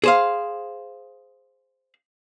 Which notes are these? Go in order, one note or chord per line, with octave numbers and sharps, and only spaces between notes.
G#4 C5 F5